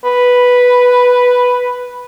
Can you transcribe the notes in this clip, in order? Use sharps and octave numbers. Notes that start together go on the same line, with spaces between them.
B4